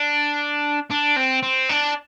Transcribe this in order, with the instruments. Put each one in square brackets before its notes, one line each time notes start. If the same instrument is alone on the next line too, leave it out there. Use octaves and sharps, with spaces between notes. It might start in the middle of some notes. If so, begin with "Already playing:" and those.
Already playing: [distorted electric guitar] D4
D4
C4
C4
D4